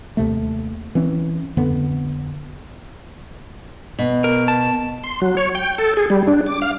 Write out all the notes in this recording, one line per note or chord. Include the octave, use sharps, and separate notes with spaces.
D#2 C3 A3
E3 C4 C#4
F2 D3 B3
B2
A#4
A5
C6
F#3
C#5
G5
A4
G#4
G3
D4
D6
F5